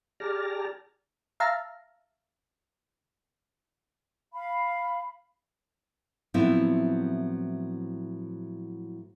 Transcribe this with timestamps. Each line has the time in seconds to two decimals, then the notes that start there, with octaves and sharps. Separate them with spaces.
0.20 G4 G#4 D5 A5 A#5 F6
1.40 E5 F5 A5 A#5
4.33 F5 B5
6.34 A2 F3 F#3 B3 C4 E4